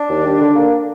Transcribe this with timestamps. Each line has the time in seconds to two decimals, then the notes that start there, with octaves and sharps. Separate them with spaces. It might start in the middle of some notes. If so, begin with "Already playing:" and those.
Already playing: D4
0.09 D#2
0.25 G3
0.40 D3
0.56 A#3